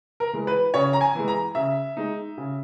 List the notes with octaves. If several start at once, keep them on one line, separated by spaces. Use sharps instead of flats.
A#4
E3 G#3
B4
C#3 C#5
A#5
G#5
E3 G#3
A#5
C#3 E5
G#3 D#4
C#3